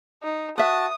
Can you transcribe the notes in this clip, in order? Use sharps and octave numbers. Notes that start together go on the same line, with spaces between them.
D#4
F#4 B4 E5 A5 D#6